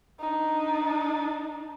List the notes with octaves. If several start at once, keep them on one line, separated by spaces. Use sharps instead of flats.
D4 D#4